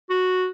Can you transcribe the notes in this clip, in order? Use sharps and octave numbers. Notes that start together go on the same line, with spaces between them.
F#4